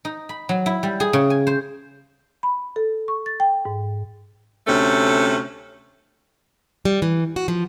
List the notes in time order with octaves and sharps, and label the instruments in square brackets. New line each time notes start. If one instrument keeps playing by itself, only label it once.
[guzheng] D#4
B5
F#3
E4
G3
G#4
C#3
G#5
C5
[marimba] B5
A4
C#6
A6
G5
G#2
[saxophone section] D2 C3 A3 C#4 A4
[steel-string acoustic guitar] G3
E3
F#4
F3